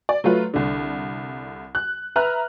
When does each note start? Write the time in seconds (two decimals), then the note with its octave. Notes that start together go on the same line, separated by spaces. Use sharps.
0.09 D5
0.24 F#3 A3 F4 B4
0.54 C2 D3
1.75 F#6
2.16 B4 E5 A#5 F6 F#6